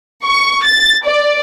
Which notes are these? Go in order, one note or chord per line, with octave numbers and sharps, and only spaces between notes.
C#6
A6
D5